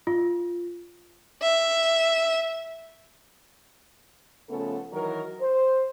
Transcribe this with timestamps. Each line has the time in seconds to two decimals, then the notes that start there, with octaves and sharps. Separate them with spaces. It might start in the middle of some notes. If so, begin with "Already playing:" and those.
0.07 F4
1.42 E5
4.48 C#3 F3 A3 B3 C#4 A4
4.92 D#3 E3 F#3 A#4
5.39 C5